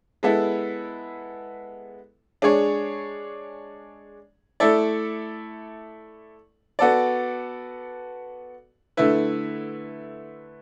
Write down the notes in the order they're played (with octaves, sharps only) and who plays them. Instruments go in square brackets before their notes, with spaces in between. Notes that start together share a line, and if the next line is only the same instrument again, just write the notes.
[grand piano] G#3 B3 E4 A4
G#3 D4 G#4 C#5
A3 E4 A4 D5
B3 F#4 A4 D5
D3 A3 E4 B4